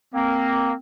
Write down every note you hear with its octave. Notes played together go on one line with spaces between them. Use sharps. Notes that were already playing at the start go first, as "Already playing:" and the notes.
A#3 C4